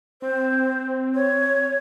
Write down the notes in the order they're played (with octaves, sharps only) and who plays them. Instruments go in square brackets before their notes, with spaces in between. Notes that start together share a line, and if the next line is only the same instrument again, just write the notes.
[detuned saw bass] C4 [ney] C5
[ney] C#5